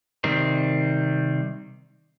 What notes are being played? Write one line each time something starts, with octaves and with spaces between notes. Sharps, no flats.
C3 D#3 G3 C4